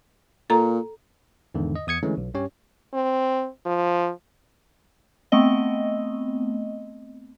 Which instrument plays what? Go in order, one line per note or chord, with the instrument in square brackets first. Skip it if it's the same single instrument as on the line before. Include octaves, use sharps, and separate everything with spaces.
[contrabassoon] A#2 [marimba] A4 A#5
[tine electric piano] E2 G#2 D3 D#3
D#5
E2 D#6 G#6 C#7
D3 E3 G#3 A3 C#4
B1
G2 C#4 G4 C#5
[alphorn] C4
F3
[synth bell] A3 B3 C4 D#5